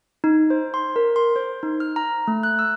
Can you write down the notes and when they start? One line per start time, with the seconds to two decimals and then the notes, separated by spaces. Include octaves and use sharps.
0.24 D#4
0.50 C5
0.74 C6
0.96 A#4
1.16 C6
1.36 C5
1.63 D#4
1.80 F6
1.96 A#5
2.28 A3
2.43 F#6
2.59 E6